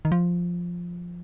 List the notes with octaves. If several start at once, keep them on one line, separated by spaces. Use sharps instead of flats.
D#3
F3